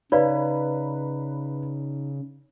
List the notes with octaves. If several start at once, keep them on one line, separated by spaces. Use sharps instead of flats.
C#3 D#4 B4 C#5 D5 F5